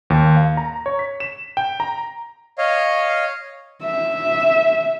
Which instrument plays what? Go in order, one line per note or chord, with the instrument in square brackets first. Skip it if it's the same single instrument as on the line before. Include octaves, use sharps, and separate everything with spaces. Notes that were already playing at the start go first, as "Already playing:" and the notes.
[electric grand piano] D#2
F5
A#5
C#5
B6
E7
G5
A#5
[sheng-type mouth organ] C#5 D#5 F5
[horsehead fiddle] E5